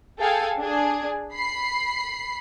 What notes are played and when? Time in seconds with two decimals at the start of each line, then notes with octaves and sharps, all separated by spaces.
0.19 G#4 A4 F5 G5 G#5
0.59 D4 G#4
1.35 B5 C7